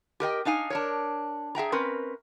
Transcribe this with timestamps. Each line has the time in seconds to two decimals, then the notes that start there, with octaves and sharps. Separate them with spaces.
0.20 G4 A#4 D#5 G5
0.45 D4 D#4 F5 G#5
0.70 D4 A#4 C#5
1.55 G#4 E5 G5 A#5
1.72 C4 C#4 A#4 B4